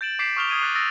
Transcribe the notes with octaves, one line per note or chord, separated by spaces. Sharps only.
G6 A6 D7 E7 F#7
D6 G6 B6 C7 D7 E7
C#6 D#6 F6 E7 F7 G7
D#6 G#6 D#7
D6 F#6 A6 C7
D#6 E6 A6 A#6 D7